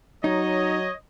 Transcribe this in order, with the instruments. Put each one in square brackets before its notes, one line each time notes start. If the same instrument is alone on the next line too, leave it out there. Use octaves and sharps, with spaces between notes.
[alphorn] F#3 [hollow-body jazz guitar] D#4 [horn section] C#5 D#5